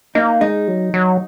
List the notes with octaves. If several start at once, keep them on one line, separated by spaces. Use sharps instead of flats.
A#3 D#4
G#3 D#4
F#3
F#3